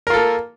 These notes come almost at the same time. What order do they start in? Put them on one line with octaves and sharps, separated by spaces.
A#4 F4 A4 A#3